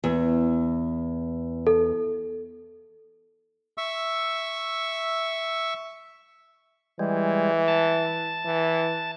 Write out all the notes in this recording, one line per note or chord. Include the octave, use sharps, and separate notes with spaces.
E2
A4
E5 C#6 E6
E3 G3 G#3
A5
E3